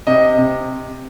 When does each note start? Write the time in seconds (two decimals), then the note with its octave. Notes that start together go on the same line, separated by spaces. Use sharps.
0.07 C3 D#5
0.38 C3